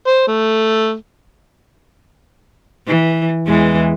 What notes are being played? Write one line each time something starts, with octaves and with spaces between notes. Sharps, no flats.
C5
A3
E3
E2 E3 G#3